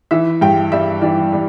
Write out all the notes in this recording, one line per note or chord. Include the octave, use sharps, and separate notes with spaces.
E3 E5
G2 G5
G3 E5
E3 D5
G3